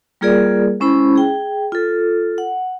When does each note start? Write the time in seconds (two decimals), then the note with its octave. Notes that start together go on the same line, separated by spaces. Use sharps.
0.21 G3 A#3 F4 G#4 A#4 D5
0.80 G#3 C#4 E4 C5 B5
1.16 G#4 G5
1.72 F4 A4
2.38 F#5